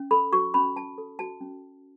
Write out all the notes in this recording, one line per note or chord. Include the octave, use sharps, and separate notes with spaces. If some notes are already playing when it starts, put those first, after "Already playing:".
Already playing: C#4
A4 B5
F#4 C#6
C#4 B5
C#4 A5
A4
F#4 A5
C#4